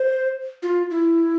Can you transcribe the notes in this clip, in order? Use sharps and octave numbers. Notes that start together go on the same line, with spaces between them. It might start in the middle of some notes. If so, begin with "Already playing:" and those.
Already playing: C5
F4
E4